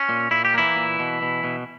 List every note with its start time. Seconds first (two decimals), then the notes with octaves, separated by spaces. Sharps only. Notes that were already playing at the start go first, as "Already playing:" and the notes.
Already playing: C#4
0.09 A#2
0.31 A#2 E4
0.45 G4
0.54 E3 A#3 E4
0.76 A#2
0.99 B2
1.22 B2
1.44 B2